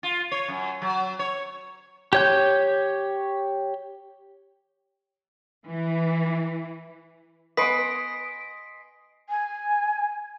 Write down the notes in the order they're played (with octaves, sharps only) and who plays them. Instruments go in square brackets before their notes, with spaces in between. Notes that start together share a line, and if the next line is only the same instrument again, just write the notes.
[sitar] F4
C#5
F#2
F#3
C#5
[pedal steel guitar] G4 C#5 G6
[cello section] E3
[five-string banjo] B3 B4 [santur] D#5 G#5 C6 [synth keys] D#6 D7 [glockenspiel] B6
[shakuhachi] G#5